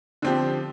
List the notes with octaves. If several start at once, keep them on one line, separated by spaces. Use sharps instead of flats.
D3 F3 C4 G4